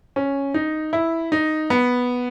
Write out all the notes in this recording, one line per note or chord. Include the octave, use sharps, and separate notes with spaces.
C#4
D#4
E4
D#4
B3